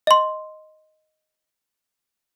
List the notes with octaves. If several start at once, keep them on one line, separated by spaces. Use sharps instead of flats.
D#5 C6